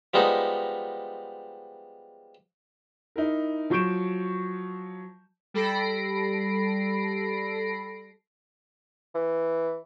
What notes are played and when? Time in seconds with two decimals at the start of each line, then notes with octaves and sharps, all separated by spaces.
0.14 F3 G3 G#3 B3 D#4
3.16 D#4 E4 A#4
3.70 F3 F#3 C#6 G6 D7 E7
5.54 G3 A4 B5 A#6 C7 D7
9.14 E3